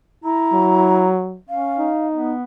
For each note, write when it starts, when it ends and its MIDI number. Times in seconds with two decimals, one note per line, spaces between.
0.24 1.11 64
0.24 1.10 82
0.53 1.39 54
1.49 1.88 61
1.49 2.07 77
1.79 2.35 63
2.12 2.43 59